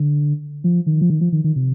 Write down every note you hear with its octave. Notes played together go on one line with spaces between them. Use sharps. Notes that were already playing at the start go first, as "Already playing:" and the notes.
Already playing: D3
F3
D#3
F3
D#3
F3
D#3
D#3
C3